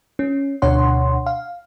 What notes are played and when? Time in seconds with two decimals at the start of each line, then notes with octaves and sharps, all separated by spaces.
0.19 C#4
0.62 D2 B2 D4 C#5 F#5 C6
1.26 F5